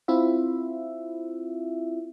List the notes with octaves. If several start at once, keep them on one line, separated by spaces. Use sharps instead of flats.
C4 E4 F4 E5